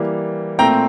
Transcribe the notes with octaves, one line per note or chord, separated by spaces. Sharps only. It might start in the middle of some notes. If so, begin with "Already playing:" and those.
Already playing: E3 G3 A#3
A#2 A3 C4 G5 A#5